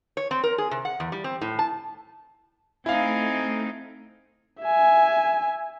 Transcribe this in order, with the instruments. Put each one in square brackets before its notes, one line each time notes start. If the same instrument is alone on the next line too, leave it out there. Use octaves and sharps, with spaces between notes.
[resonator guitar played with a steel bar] C#5
C4
A#4
G#4
C3
F#5
E2
G3
C4
A2
A5
[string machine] A3 [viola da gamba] C4 D#4 [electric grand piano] E4 F5 [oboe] G#5
[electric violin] E5 G#5